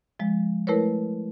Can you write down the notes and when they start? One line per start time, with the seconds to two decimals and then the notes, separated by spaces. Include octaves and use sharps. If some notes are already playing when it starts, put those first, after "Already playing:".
0.19 F3 G#3
0.67 A3 E4 A#4 B4 C#5